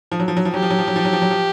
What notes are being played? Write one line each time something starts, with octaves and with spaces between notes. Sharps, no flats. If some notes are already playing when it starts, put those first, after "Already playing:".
F3
F#3
F3
F#3
F3
F#3 G4
F3
F#3
F3
F#3
F3
F#3
F3
F#3
F3